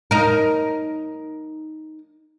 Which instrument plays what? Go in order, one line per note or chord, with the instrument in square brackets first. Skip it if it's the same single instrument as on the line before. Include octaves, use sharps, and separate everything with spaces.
[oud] D#4 A#4